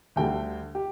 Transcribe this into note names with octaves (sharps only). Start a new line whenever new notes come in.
D2 D3 G3 G5
G4